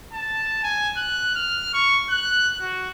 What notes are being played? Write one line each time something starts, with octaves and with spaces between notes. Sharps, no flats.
A5
G#5
F#6
F6
C#6
F#6
F#4